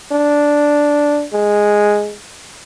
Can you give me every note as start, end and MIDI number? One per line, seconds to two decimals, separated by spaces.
0.12 1.25 62
1.33 2.14 56